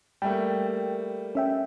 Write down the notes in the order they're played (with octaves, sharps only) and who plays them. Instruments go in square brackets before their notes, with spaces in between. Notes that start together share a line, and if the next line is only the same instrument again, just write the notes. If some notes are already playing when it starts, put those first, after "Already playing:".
[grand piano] G3 A3 A#3 [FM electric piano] G5
[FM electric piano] C#4 E5 G5